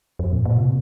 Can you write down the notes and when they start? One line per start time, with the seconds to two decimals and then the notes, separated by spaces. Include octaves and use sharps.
0.19 F2
0.33 A#2
0.45 A#2
0.57 C3